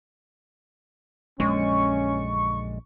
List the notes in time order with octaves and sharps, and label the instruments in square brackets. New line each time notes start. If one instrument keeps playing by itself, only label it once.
[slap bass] A#1 F#2 D3 [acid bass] G#3 [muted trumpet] C#4 [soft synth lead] C#6